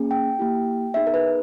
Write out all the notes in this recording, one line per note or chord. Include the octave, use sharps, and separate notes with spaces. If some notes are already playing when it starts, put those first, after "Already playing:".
Already playing: A#3 C#4 G#4
G5
A#3 E4 G4
B3 D#4 G#4 E5
A#4
B4